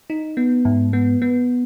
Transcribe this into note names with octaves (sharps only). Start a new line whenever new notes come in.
D#4
B3
G#2
B3
B3